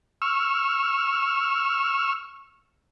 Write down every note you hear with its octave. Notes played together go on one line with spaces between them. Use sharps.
C#6 E6 F6